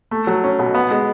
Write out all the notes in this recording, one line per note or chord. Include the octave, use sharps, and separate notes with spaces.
A3
F#3
C#4
B2
B3
G#3